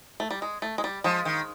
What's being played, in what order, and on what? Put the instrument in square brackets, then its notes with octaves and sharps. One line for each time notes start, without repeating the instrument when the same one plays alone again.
[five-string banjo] A3
G3
G#3
A3
G#3
G3
[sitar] F3 [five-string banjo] G#3
[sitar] D#3